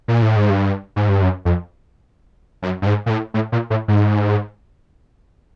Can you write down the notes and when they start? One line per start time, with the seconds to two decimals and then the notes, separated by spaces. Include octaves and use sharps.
0.08 A#2
0.22 A2
0.36 G#2
0.50 G2
0.96 G#2
1.09 G2
1.22 F#2
1.45 F2
2.63 F#2
2.82 G2
2.86 G#2
3.06 A#2
3.10 A2
3.34 A2
3.52 A#2
3.70 A2
3.88 G#2